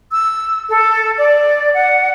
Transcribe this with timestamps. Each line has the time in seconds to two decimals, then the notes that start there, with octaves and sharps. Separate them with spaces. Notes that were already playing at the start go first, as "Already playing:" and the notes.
0.12 E6
0.69 A4
1.17 D5
1.73 F#5